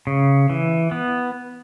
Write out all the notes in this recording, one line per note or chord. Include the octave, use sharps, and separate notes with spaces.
C#3
E3
B3